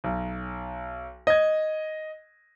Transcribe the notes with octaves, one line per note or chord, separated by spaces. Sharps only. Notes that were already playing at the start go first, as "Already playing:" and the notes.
B1
D#5 G#6